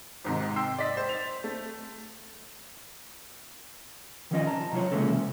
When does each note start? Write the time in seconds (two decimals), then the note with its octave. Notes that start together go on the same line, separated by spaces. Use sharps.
0.24 G#1 G#2 C3
0.56 G5 C6 E6 C7
0.78 D5 D#5 B6
0.97 C5
1.09 A6 F7
1.44 A3
4.31 D#3 F3 G3 C#4 F4 D#5
4.47 A5 A#5
4.72 C3 F#3 F4 C#5
4.91 C#3 E3 G#3 A#3 C#4 A4
5.09 C3